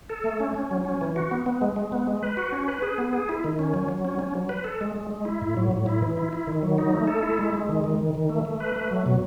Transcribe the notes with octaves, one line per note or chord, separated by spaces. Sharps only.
A4
A3
C#4
C#4
F#3
C#4
E3
F#4
B3
B3
G#3
G#3
B3
G#3
B4
F#4
C#4
B4
G#4
B3
G#4
E4
D#3
C#4
F#3
F#3
C#4
C#4
F#3
B4
A4
G#3
G#3
G#3
E4
A2
F#3
A2
E4
E3
E4
E4
D#3
F#3
D#4
A3
A4
E4
G#3
G#3
D#3
D#3
D#3
D#3
A3
A3
B4
A3
F#3
B2